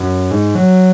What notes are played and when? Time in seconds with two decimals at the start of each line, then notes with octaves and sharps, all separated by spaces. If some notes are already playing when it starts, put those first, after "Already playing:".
Already playing: F#2
0.31 G#2
0.55 F#3